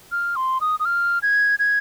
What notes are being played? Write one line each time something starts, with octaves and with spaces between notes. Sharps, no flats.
F6
C6
D#6
D#6
F6
G#6
G#6